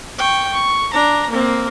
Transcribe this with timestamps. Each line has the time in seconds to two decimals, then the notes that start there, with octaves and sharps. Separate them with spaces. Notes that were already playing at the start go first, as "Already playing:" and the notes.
0.18 G5 C#6
0.53 C#6
0.93 D4 A#5
1.30 A#3 C4